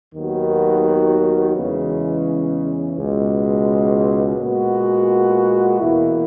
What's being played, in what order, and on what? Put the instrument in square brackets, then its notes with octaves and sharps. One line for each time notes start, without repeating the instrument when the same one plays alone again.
[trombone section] D#2 D#3 F#3 B3 F#4
E2 C#3 E3 G#3 C#4
C#2 B2 G#3
A#2 G#3 B3 F#4
E2 B2 A#3 E4